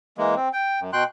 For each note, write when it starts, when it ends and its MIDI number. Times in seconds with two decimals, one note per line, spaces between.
0.18 0.35 52
0.18 0.35 56
0.18 0.35 58
0.36 0.49 60
0.53 0.80 79
0.80 0.91 42
0.93 1.04 47
0.93 1.04 79
0.93 1.04 84
0.93 1.04 90